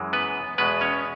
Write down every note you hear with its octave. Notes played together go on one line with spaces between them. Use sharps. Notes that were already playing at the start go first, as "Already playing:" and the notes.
Already playing: F#2 E3 G#3
B3 B4
E2 B2 G#3 B3 B4
C#4 C#5